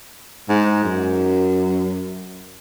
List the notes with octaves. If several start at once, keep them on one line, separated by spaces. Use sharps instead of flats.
G#2
F#2